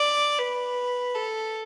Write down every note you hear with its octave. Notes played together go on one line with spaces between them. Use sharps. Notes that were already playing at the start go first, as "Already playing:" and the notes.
Already playing: D5
B4
A4